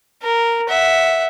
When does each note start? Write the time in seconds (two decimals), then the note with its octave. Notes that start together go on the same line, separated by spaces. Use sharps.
0.23 A#4
0.69 E5 F#5